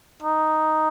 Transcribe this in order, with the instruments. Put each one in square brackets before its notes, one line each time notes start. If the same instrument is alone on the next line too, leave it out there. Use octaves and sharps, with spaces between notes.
[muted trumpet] D#4